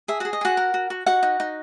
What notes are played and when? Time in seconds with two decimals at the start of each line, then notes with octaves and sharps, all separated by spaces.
0.08 G#4 E5
0.20 F#4 F#5
0.25 G#4
0.33 D#5
0.41 F#4 G#4 F#5
0.57 A#4
0.74 F#4
0.90 F#4
1.06 D#4 F#4 F#5
1.23 D#4
1.40 D#4